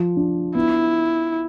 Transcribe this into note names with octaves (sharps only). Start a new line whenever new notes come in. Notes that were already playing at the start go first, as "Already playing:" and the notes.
Already playing: F3
D4
B3 E4